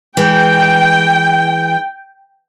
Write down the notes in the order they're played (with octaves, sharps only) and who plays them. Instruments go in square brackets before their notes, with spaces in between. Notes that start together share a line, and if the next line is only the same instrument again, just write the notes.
[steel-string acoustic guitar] E3 G#3 [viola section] G5